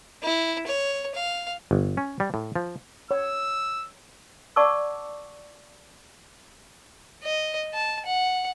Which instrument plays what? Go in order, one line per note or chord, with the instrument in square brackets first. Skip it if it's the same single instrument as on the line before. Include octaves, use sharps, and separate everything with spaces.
[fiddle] E4
C#5
F5
[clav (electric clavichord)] G1
C#4
G3
A2
F3
[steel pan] C#5 [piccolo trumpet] E6
[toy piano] D5 F#5 A5 C#6 D6 E6
[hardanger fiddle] D#5
A5
F#5